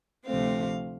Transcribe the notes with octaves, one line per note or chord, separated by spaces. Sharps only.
D2 C3 F3 A3 C4 F5